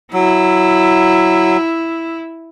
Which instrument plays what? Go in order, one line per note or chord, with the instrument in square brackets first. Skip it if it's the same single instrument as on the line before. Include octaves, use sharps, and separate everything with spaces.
[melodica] F#3 [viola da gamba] E4